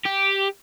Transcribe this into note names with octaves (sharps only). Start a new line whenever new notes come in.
G4